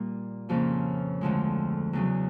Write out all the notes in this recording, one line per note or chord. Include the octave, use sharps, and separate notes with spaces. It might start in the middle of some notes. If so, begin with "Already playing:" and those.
Already playing: A#2 G3 A#3
F2 C#3 F3 A#3 C#4
D2 D3 F3 G#3
E2 C#3 F#3